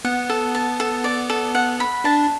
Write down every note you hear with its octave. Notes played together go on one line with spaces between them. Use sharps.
B3 F#5
A4
A5
A4
D5
A4
F#5
B5
D4 A5